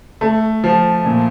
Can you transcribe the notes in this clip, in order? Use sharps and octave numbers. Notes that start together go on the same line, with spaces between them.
A3
F3
A#2